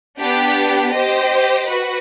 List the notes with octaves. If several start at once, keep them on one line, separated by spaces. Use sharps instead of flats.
B3 D4 G4
G4 C5 D#5
F#4 B4